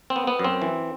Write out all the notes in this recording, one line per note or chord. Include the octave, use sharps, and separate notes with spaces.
C4
B3
B3
F#2 C4
E3